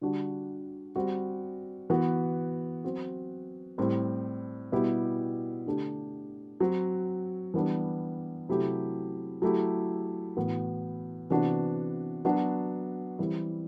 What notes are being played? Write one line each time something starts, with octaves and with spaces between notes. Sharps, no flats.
D3 G3 D4 F#4
G3 C4 F#4
E3 B3 F#4
F#3 C4 F#4
A2 G3 C4
B2 G3 B3 E4 G4
D3 A3 D4 G4
F#3 C4 F#4
E3 G3 B3 D4
C3 F#3 A3 E4 G4
F#3 A3 E4 G4
A2 E3 B3 F#4
C3 E3 B3 D4 F#4
F#3 B3 D4 F#4
E3 G3 C4 E4